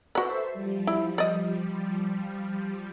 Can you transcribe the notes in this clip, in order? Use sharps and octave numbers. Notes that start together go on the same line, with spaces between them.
F#4 A4 B4 C5 E5
F3 G3
E4
D5 D#5